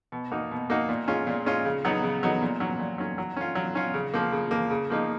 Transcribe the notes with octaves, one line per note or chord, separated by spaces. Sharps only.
B2
A#3 D#4 F#4
B2
A#3 D#4 F#4
A#2
G#3 C#4 F4
A#2
G#3 C#4 F4
C#3
F#3 B3 D#4 F#4
C#3
F#3 B3 D#4 F#4
A#2
F#3 C#4
A#2
F#3 C#4
F#3
C#4 F4
F#3
C#4 F4
C#3
F3 A#3
C#3
F3 A#3
C#3
F3 A#3 D#4